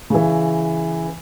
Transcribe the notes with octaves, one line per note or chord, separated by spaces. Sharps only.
C#3 E3